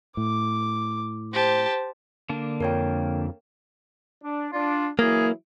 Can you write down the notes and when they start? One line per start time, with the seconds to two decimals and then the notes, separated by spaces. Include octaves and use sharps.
0.17 A2 D6
1.34 G4 C5 A5
2.29 D3 A#3 D4
2.60 F2 A#4 C#5 G5
4.23 D4
4.52 D4 F4
4.99 E3 F#3 A#3 E4 G#4